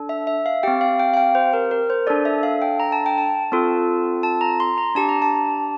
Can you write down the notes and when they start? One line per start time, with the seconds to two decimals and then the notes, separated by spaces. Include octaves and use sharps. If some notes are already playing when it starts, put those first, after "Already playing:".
Already playing: D4 A4
0.09 E5
0.27 E5
0.46 F5
0.63 C4 G4 G5
0.81 F5
1.00 G5
1.14 F5
1.17 G5
1.35 C5
1.53 A#4
1.71 A#4
1.90 C5
2.07 D4 A4 D5
2.25 E5
2.43 F5
2.62 G5
2.80 A#5
2.92 A5
3.06 G5
3.18 A5
3.52 C4 F4 A4
4.23 A5
4.41 A#5
4.60 C6
4.78 A#5
4.95 D4 G4 A5
5.09 A#5
5.22 A5